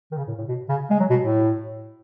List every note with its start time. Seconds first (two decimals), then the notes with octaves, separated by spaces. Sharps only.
0.12 D#3
0.17 C#3
0.27 A2
0.38 A2
0.48 B2
0.69 C#3
0.90 G#3
1.00 F#3
1.10 B2
1.21 A2